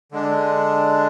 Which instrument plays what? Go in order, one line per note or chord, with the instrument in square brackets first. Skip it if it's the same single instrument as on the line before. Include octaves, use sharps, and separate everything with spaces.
[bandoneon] D3 G#3 D4